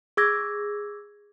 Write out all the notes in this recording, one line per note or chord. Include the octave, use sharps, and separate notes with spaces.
G#4 D6 E6 G#6 A#6